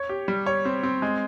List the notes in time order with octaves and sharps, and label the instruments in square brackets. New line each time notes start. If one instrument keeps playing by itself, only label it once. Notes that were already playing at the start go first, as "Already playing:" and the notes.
Already playing: [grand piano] C#5
G4
G3
C#5
C4
C4
G#3